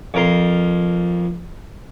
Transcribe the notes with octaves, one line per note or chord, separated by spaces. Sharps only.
F2 A#4 C6